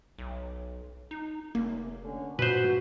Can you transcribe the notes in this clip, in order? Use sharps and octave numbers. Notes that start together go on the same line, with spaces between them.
B1
D#4
F1 A#3
D3 C#4
G2 A#2 F#4 B4 C5